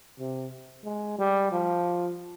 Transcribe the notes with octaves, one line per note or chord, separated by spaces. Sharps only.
C3
G#3
G3
F3